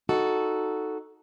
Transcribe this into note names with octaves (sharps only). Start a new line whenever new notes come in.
D#4 F#4 A4